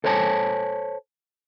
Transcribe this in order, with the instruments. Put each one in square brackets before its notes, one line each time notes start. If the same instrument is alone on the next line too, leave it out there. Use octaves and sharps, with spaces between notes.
[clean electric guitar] A4 C5 C#5 G#5 A5